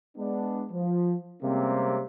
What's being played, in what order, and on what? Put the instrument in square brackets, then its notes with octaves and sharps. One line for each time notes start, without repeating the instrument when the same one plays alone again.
[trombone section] G#3 B3 D4
F3
C3 G3 G#3 A#3 C4 C#4